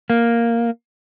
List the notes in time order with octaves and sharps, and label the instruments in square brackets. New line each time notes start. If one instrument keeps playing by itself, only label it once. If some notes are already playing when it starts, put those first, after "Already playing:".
[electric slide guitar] A#3